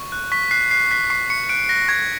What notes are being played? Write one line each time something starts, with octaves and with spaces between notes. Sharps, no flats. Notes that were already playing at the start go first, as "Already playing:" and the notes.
Already playing: C#6
F#6
C#6 B6
F#6 C7
F#6 C7
F#6 B6
C#6 C7
C#6 C#7
F#6 D7
F#6 A#6
C#6 G#6